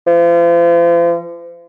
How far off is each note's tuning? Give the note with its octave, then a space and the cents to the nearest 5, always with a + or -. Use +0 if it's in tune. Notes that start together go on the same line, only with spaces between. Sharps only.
F3 -40